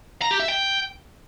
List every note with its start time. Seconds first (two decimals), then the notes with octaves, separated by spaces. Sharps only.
0.22 A#5
0.31 G4
0.40 E5
0.48 G5